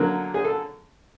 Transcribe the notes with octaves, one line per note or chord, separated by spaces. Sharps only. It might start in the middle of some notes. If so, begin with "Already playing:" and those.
Already playing: D3 F#3 A#3 A#4
G#4
A4